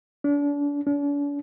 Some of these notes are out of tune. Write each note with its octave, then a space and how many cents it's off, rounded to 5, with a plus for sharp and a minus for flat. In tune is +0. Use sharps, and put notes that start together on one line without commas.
D4 -35
D4 -45